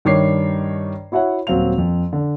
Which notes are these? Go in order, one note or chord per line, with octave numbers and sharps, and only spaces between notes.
G2 D#3 D4 C#5 D6 C7
E4 F#4 C#5 E5 F#5
D#1 F#3 C4 F5 F7
F2
D3